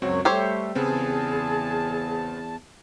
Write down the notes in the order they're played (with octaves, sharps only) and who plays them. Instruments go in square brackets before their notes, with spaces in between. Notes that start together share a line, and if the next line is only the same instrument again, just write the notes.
[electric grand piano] C#2 C4 F#4 [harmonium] F#2 F#3 C#5
[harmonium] G3 A3 [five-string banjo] G4 C5 C#5 [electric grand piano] C#6 E6
[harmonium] E2 A5 [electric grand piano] C#3 B3 C4 [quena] G#4